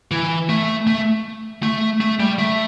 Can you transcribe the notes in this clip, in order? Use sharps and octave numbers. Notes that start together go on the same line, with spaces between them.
E3
A3
A3
A3
A3
G3
A3